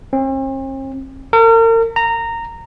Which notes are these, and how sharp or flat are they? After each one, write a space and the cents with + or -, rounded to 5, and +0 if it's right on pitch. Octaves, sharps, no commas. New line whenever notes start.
C4 +45
A#4 -40
A#5 -15